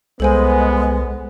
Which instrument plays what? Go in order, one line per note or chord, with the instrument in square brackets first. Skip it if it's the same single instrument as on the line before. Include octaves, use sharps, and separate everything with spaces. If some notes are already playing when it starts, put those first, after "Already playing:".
[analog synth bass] C2 [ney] G#3 [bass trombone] B3 [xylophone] A4 C5 G#5